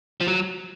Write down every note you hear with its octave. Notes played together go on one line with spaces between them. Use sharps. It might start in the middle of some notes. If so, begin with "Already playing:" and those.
F3
F#3